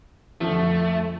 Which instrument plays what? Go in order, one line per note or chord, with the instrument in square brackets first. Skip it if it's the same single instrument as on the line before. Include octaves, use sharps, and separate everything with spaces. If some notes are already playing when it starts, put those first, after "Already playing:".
[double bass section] F2 [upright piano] D3 F3 [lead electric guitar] A3